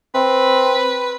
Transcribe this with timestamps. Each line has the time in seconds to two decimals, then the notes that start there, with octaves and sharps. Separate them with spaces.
0.14 C4 B4